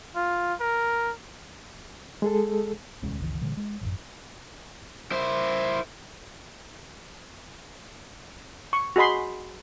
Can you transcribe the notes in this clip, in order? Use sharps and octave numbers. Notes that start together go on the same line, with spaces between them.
F4
A#4
G#3 G#4 A4
E1 D2 G#3 C#4
F#1 C#2 D#3 E3
A#2 D3 E3 G#3
G#3
A1 F#2
E4 C5
C#6
F#4 G#4 D#5 B5 C6